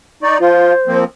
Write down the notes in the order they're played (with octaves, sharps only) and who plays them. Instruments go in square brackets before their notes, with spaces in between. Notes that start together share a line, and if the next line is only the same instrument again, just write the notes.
[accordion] D#4 D5 [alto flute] C#6
[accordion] F3 F4 [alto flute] C5
[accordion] F3 A#3 C4